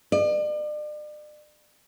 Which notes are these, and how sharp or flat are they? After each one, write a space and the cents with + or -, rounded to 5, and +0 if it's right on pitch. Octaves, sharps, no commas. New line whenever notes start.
D5 +40